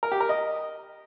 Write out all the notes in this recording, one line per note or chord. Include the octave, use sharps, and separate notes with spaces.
A#4
G4
A#4
D#5